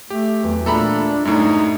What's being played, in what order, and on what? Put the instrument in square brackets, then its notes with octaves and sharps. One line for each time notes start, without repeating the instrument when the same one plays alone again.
[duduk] A3 [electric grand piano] G4
[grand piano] E2 F#3 B3
[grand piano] A#2 G#3 A3 [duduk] D4 [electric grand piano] A4 A#5 B5
[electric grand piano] F#2 A2 [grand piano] G#3 A3 D4 [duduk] D#4